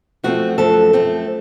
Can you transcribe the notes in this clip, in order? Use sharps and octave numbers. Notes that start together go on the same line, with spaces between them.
F#2 F3 A3 C4 F#4
F#2 F3 A3 C4 A4
F#2 F3 A3 C4